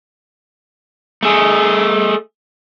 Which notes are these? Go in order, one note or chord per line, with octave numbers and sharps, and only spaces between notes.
A3 G#4